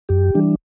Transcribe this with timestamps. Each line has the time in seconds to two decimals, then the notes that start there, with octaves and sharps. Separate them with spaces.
0.09 F#2 G4
0.35 E3 G3 D4